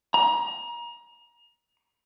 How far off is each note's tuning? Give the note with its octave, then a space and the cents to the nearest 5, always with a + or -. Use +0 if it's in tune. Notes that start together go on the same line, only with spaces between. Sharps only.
A#5 +30